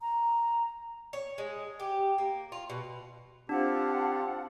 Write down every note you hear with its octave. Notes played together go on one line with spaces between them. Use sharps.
A#5
C#5
G#3
G4
A#3
F4
B2
C4 D4 F4 G4 F#5 A5